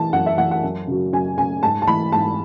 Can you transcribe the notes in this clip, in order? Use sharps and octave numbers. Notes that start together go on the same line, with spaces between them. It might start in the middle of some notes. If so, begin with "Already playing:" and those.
Already playing: E3 A5
F#2 F#5
E5
E3 F#5
F#5
F#2
C#3 F#3
F#2 G#5
C#3 F#3 G#5
G#2 A5
A5
E3 B5
G#2 A5